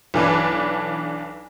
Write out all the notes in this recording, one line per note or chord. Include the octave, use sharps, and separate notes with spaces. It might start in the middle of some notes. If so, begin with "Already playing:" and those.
B1 E3 D4 B4